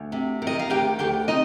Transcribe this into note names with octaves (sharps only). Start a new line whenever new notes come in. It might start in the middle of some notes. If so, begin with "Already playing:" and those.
Already playing: D2
C3
D#3
D#5
F5
D2 G4 G5
D2 G4 G5
C3 D#4 D#5